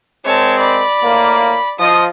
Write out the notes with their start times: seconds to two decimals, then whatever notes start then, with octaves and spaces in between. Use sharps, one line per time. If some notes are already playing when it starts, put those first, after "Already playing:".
0.24 G#3 C4 A#4 C#5 A5
0.59 D5 B5
1.01 A2 A#3
1.79 F3 D#5 D#6